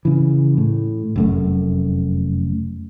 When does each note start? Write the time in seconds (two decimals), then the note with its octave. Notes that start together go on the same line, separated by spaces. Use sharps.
0.05 C#3 E3
0.57 A2
1.16 F1 F#2 A3